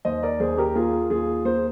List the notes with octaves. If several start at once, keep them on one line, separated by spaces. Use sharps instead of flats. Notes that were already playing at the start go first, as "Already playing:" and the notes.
D#2 C5 D#5
A#4 D5
D#2 G#4 C5
G4 A#4
A#3 F4 G#4
D#2 F4 G#4
A#3 G#4 C5